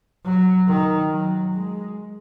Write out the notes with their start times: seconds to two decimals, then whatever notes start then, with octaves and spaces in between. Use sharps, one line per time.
0.24 F#3
0.68 D#3
1.11 F#3
1.54 G#3